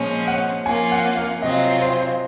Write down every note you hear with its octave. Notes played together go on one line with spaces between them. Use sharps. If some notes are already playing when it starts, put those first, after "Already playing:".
Already playing: A#2 F3 G#3 C#4 G#5
F#5
F3 A#3 C#4 F4 G#5
F#5
F5
C3 F#3 C4 F4 D#5
C5
C5